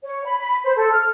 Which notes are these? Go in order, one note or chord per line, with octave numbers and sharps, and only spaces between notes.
C#5
B5
B5
C5
A4
F6